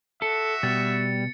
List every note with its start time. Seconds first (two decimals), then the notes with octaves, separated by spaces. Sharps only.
0.22 F#4 A4 E5 C#7
0.63 B2 G3 A6